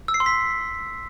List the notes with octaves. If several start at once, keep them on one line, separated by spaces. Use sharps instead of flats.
E6
C7
C6
B6